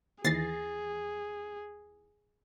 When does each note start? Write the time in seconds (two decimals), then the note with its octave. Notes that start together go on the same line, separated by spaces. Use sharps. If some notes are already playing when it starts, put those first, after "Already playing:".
0.24 D#2 E3 G#4 A6 A#6 C7